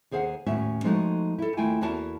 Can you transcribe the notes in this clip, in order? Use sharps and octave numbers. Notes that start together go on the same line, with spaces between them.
D#2 G#4 C5 F5 F#5
D#2 A2 C#4 F#4 E5
F3 G#3 A3 B3 D#4 F#4
E4 A4
D#2 A3 E4 F4 G5 G#5
E2 A#3 E4 F#4 A#4 A5